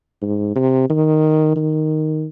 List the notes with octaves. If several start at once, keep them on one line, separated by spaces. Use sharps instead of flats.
G#2
C3
D#3
D#3